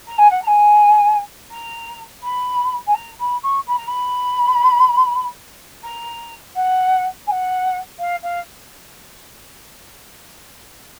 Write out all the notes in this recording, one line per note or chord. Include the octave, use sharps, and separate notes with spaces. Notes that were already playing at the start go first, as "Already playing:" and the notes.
A#5
G#5
F#5
A#5
G#5
A#5
B5
G#5
A#5
B5
C#6
B5
A#5
B5
A#5
F#5
G#5
F#5
F5
F5